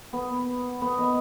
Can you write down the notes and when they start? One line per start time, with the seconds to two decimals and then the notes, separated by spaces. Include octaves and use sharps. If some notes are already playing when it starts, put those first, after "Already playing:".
0.13 B3
0.81 B3
0.98 D#5